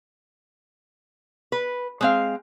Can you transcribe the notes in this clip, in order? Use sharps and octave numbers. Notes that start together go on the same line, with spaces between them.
B4
G#3 C4 F5